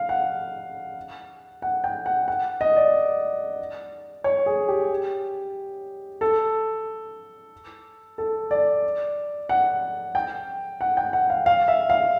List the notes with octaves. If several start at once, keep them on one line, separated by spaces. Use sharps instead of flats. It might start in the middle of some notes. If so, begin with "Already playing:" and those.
Already playing: F5
F#5
F#5
G5
F#5
F#5
D#5
D5
C#5
G#4
G4
A4
A4
D5
F#5
G5
F#5
G5
F#5
F5
F5
E5
F5